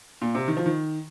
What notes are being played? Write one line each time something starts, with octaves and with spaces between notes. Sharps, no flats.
A#2
C3
D#3
F3
D#3